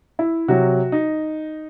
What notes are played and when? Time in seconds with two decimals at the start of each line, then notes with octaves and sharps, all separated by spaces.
0.19 E4
0.48 C3 F#3 F#4
0.92 D#4